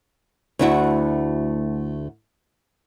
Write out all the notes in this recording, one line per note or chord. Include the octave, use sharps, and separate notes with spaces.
D2 A3 D4 E4 F#4